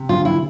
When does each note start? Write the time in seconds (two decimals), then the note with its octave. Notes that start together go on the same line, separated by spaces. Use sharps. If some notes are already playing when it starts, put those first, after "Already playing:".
Already playing: C3
0.09 D2 F4
0.25 E4